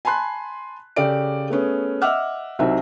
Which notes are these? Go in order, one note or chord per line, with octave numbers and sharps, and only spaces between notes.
G#5 A5 B5 C6 F#6
C#3 G4 A4 D5 G5 D7
A3 B3 C#4 G#4
D#5 E5 F#5 D6 E6 F6
C2 F#3 C4 D#4 E5